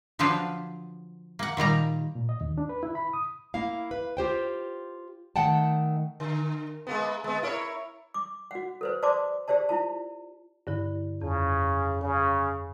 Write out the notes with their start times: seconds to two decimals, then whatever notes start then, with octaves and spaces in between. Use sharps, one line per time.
0.19 D3 F3 F#3 D4 B4 C5
1.39 A#3 F#5
1.57 A#2 D#3 G3 A#5
2.15 A#2
2.29 D#5
2.41 D#2
2.58 D4
2.69 B4
2.83 E4
2.95 B5
3.13 D#6
3.54 A#3 E4 F5
3.91 B4
4.17 F4 G4 C5 G5
5.36 D#3 A3 F#5 G5 A5
6.20 D3
6.87 G#3 A#3 B3
7.24 G#3 B3
7.43 E4 A#4 C#5
8.14 D6
8.51 F#4 F#5
8.81 A4 B4 C5
9.03 C5 D5 A5 C6 D6
9.48 G4 G#4 C5 D5 A5
9.69 E4 F4 A5
10.67 G2 D3 E4
11.22 F2 C#3
12.01 C#3